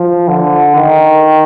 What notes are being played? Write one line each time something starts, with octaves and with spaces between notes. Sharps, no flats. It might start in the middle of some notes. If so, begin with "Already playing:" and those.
Already playing: F3
D3
D#3